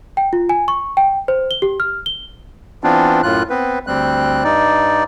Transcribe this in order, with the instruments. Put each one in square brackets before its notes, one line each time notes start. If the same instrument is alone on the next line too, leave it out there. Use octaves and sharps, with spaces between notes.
[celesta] G5
F4
G#5
C#6
G5
C5
G7
G4
F6
G7
[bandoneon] E3 B3 C4 D4 F4
F#2 A2 F4 F#6
B3 C4 B4
D2 G3 C4 F#6
G2 D#4 D5